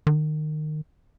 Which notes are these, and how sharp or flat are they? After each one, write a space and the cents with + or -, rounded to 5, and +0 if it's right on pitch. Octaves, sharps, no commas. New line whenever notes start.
D#3 -25